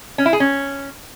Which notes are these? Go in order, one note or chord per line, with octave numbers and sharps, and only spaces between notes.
C#4
E4
G#4
C#4